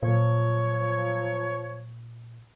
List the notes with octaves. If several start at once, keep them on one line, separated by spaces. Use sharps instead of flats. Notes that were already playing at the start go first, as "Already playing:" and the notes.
A#2 F3 F#3 C#5